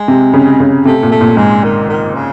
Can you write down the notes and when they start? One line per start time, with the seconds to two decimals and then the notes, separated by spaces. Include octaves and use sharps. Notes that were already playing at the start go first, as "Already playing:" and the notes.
Already playing: G#3
0.08 C3
0.34 C#3
0.60 C#3
0.85 C3 A3
1.03 A#2
1.12 A3
1.21 A#2
1.37 G#2 G#3
1.64 D#3
1.89 D#3
2.15 C#3